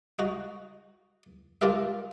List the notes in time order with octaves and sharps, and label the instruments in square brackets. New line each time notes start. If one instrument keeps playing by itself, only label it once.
[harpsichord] D#4 F#4
D4 F4 G4 A#4 E5